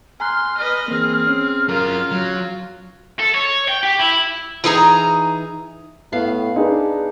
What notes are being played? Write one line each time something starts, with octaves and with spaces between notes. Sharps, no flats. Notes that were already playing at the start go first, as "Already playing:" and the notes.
G#5 A#5 C6 F6 F#6
B4 D#5
E3 A#3 C4 G#4
C#4
F#3 F4 A#4 F5
F#3
A4
C#5
G5
G4
E4
E3 D#4 G#4 A#5
A2 B3 F5
D4 D#4 G#4 B4